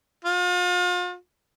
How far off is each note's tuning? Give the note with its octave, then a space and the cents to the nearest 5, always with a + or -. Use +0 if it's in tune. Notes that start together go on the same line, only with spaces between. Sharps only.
F4 +40